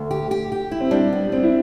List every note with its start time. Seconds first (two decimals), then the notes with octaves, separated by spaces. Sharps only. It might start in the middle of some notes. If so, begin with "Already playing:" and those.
Already playing: D2
0.11 G4
0.31 G4
0.52 G4
0.71 E4
0.80 C4
0.91 G3 D4
1.12 B3
1.32 G3 C4
1.43 E4